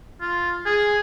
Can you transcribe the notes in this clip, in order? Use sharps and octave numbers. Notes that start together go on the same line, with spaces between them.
F4
G#4